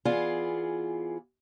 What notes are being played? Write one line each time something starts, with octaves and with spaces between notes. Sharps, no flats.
E3 B3 F4 G#4 D5